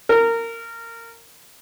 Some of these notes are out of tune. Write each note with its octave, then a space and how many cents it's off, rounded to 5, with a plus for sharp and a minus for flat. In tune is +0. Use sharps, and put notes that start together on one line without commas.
A#4 -20